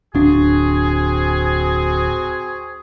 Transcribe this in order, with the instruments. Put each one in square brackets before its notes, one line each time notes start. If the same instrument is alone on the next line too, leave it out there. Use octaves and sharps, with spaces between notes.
[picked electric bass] D1 D4 [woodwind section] C4 F#4 G#4